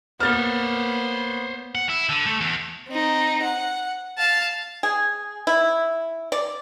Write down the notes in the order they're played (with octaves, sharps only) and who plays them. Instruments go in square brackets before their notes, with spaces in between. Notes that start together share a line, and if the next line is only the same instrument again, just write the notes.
[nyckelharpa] A#3 [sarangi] B3 [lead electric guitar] C5 C#5 [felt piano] F6 A6
[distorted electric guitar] F#5
E4
D3
A3
E2
[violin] C4 D#4
F#5
F5 A5
[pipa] G#4
E4
D5